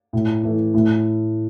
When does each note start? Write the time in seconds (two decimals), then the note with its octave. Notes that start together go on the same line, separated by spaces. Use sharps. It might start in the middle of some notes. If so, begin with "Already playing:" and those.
0.13 A2
0.43 E3 A3
0.74 A2